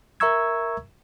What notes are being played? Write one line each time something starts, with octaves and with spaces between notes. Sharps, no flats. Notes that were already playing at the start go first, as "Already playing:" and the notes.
A#4 E5 A#5 C#6 E6 G#6